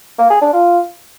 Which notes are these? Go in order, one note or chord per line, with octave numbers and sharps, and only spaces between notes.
A#3
G#4
D4
F4